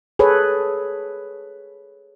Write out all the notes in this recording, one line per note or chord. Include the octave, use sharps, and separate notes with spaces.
G#4 A4 B4 C#5